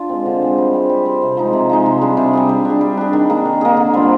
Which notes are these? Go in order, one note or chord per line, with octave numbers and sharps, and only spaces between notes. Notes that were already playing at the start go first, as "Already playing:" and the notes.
Already playing: D4 F4
G#3 C4
D3
G#3 C4
G3
C4 G4
G3
C4 G4
C3
F3 G#3 D#4
C3
F3 G#3 D#4
C3
G3 D4 G#4
C3
G3 D4 G#4
G3
D4 G#4
G3
D4 G#4
D#3
A#3 D4 G#4
D#3
A#3 D4 G#4
D3
G3 C4 F4